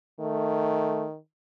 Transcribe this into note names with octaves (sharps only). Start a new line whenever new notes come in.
D#3 A3